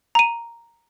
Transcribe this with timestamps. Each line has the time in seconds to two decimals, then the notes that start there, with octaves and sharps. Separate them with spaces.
0.15 A#5 D#7